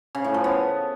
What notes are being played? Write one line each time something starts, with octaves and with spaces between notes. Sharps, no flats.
C#3
A2
F3
B3